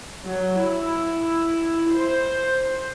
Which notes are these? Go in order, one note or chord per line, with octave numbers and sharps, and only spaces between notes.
F#3
E4
C5